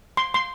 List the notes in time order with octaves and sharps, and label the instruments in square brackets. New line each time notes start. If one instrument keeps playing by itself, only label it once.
[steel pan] C6
C6